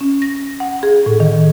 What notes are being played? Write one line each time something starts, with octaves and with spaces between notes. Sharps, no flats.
C#4
A#6
F#5
G#4
A2
D#3